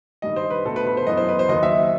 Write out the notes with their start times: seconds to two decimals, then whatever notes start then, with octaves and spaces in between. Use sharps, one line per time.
0.22 G2 D#3 G3 D#5
0.36 C5
0.50 B4
0.65 B2 A3 A4
0.76 B4
0.87 B4
0.97 C5
1.07 F#2 E3 B3 D#5
1.17 C5
1.29 B4
1.39 C5
1.49 D#2 D#3 F#3 D#5
1.63 E5